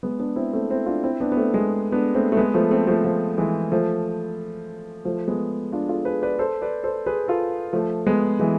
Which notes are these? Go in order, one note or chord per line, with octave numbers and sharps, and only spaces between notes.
G#3 B3
B3 D4
C4 E4
A3 C4
C4 E4
D4 F4
C4 E4
B3 D4
B3
A3 C4
G#3 B3
B3 D4
A3 C4
A3
G#3 B3
F3 A3
A3 C4
F3 A3
F3
E3 G#3
F3 A3
F3 A3
G#3 B3
D4 F4
F4 A4
G#4 B4
B4 D5
A4 C5
B4 D5
A4 C5
G#4 B4
F4 A4
F3 A3
G#3 B3
E3 G#3